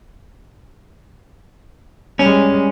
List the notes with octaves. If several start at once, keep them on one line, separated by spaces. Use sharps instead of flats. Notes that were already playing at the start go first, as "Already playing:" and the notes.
G3 G#3 C#4